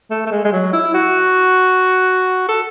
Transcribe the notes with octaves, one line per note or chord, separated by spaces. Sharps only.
A3
A3
G#3
G#3
F#3
E4
F#4
A4